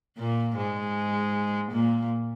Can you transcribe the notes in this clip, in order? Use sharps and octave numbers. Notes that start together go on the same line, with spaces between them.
A#2 A#3
G#2 G#3
A#2 A#3